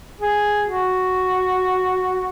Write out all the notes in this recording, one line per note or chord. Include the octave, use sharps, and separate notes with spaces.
G#4
F#4